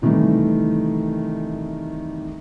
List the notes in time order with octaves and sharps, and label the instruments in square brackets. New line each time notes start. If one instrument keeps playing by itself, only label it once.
[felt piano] C3 D#3 E3 G3 A3